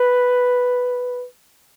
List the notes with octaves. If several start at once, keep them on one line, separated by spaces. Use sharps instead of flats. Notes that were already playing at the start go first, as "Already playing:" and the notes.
Already playing: B4